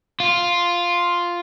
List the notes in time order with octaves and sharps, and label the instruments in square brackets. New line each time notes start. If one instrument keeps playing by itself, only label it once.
[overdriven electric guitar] F4